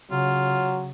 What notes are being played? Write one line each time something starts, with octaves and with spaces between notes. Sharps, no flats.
C#3 F#3 F4